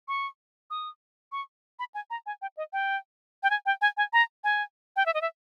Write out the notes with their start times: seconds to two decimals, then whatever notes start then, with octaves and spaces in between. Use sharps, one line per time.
0.08 C#6
0.70 D#6
1.32 C#6
1.79 B5
1.95 G#5
2.10 A#5
2.26 G#5
2.42 G5
2.57 D#5
2.73 G5
3.43 G5
3.50 G#5
3.66 G5
3.81 G#5
3.97 G#5
4.13 A#5
4.44 G#5
4.96 G5
5.06 E5
5.14 D#5
5.21 E5